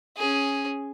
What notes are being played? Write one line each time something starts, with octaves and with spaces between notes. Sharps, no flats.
C#4 G#4